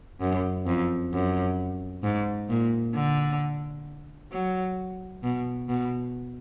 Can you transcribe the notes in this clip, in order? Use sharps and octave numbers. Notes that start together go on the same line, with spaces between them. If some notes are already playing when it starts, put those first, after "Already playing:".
F#2
F2
F#2
G#2
A#2
D3
F#3
B2
B2